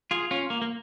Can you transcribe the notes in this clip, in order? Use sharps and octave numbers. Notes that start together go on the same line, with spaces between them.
F4 G#4
C#4 F4
A#3
A#3